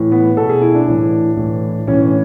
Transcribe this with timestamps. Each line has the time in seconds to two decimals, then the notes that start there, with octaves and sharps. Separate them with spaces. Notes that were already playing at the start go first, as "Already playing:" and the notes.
Already playing: A2 E3
0.12 B3
0.37 B2 A4
0.49 G#4
0.62 E4
0.75 D4
0.87 A2 E3
1.37 A2 E3
1.87 A2 E3 C#4